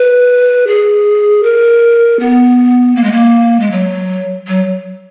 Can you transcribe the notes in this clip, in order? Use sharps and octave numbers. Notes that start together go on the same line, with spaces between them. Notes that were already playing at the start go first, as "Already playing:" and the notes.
Already playing: B4
G#4
A#4
B3
A#3
G#3
A#3
G#3
F#3
F#3